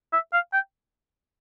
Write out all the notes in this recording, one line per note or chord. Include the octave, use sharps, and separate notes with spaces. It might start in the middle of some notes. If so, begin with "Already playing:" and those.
E5
F5
G5